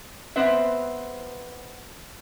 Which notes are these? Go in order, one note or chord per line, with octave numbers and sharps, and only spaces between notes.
B3 C4 B4 C5 E5